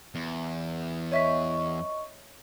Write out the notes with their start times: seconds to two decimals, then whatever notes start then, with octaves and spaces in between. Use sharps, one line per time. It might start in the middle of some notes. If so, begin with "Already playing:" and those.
0.15 E2
1.12 C#5 D#5 E5 C#6 B6